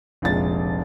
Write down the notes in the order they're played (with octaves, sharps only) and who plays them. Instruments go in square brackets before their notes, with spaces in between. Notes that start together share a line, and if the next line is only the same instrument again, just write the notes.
[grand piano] F1 A#1 G#3 A6